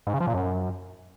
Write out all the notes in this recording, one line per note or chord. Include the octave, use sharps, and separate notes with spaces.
G#2
C#3
F3
A#2
F#2